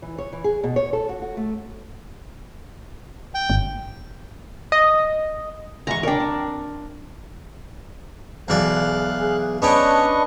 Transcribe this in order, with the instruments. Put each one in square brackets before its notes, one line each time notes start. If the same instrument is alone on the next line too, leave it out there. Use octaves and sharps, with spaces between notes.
[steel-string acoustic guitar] E3
C#5
E3
G#4
B2
C#5
A4
F#4
F#4
A3
[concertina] G5
[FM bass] G1
[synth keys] D#5
[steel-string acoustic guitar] G#2 E3 G#3 [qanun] A#5 C#6
[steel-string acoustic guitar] C#3 D5 G5 [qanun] D4 A#4
[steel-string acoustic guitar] C4
[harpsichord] B1 E3 D5 [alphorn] G#4 [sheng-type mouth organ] F5 F#6
[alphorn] G#4
[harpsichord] B3 C#5 G5 [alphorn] C#4 [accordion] D4 B4 [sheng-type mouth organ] D#5 C#6